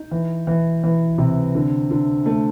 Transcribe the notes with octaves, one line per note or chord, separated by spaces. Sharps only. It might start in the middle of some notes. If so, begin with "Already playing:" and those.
Already playing: D#4
E3
E3
E3
C3
D3
D3
A3